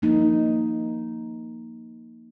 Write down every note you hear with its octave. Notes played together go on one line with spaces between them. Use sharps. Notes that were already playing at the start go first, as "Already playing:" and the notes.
F3 A#3 D#4